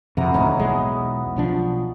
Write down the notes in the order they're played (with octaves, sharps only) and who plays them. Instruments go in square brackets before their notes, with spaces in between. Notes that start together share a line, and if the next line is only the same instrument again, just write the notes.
[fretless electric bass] F2 C3 [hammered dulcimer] E4 F#5 A#5
[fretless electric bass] D#1 D2 A2 [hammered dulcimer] C#4 D#4
[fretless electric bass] B1 E2 G#3 [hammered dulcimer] B3
[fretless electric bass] B1 F3 D4